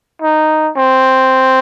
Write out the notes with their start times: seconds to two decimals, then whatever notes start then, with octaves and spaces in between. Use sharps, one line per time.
0.22 D#4
0.76 C4